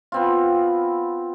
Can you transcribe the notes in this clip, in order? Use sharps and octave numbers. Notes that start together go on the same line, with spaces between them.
B3 C4 F4